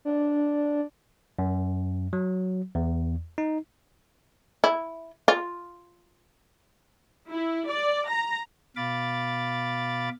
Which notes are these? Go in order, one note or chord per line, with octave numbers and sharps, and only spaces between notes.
D4
F#2
F#3
E2
D#4
E4
F4
E4
D5
A#5
B2 F5 B5 D6 A6